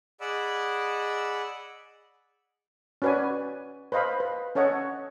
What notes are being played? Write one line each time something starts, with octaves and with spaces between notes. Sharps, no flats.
G#4 D5 D#5 F#5 B5 E6
C#4 F#4 B4 D5 G#5
B4 C5 D#5 F5 B5
B4
C#4 A4 C#5 D#5 F#5